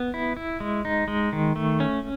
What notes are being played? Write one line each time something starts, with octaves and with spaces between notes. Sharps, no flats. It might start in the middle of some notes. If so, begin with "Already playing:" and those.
Already playing: B3
E4
E4
G#3
D#4
G#3
D#3
A3
C#4